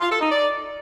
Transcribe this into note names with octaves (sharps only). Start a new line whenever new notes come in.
F4
A4
D#4
D5